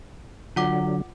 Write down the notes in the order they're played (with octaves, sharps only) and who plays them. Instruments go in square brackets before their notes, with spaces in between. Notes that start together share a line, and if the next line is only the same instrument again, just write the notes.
[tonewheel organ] D3 F#3 [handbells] F4 F#5 D6